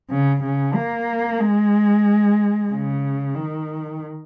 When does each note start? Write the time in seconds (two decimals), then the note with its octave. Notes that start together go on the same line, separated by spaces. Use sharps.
0.10 C#3
0.43 C#3
0.75 A#3
1.40 G#3
2.70 C#3
3.35 D#3